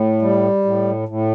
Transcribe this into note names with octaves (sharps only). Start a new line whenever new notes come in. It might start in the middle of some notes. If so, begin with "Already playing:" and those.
Already playing: A2
G3
A2
A2